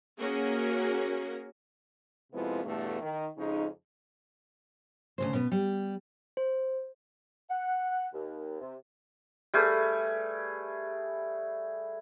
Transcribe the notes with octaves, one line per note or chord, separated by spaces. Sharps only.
A#3 C#4 F#4 G#4 A#4
F2 C3 F3 G#3 B3 E4
E2 G2 B2 A3
D#3
F2 C#3 G#3 D#4
D2 C#3 C5
B2 B3
G3
C5
F#5
D#2
C3
G3 A3 G#4 B4